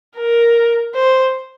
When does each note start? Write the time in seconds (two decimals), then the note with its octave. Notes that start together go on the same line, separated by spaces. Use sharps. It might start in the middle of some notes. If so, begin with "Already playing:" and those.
0.16 A#4
0.94 C5